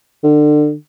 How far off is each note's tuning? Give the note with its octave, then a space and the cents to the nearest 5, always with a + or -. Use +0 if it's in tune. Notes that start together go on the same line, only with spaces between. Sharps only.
D3 +30